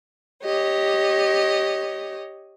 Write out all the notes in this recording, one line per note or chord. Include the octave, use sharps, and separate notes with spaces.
G4 C#5 D#5